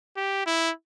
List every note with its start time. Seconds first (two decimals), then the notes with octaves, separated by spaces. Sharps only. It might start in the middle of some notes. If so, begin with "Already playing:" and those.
0.17 G4
0.46 E4